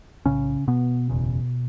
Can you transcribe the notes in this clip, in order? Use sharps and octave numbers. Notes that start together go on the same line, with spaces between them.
B1 A2 C#3 C#4
B2 B3
F#1 E2 C#3